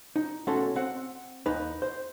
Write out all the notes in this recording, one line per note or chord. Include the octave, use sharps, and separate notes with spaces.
D#4
B1 A3 C#4 F#4 A4 C6
C4 F#5
D#2 D#4 B4
C5